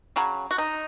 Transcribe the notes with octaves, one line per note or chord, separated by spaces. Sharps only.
C#3 F#3 C#4
F#4
D#4